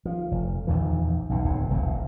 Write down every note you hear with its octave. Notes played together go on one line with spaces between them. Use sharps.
F3
F1
A#1 E2 D#3 E3
B1 G2 B2
D1 E2 C3
E1 C2 A#2